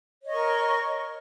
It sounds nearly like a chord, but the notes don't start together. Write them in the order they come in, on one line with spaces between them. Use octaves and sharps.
C#5 D#5 C#6 A#4